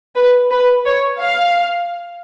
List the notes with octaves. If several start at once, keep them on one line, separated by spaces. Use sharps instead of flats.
B4
B4
C#5
F5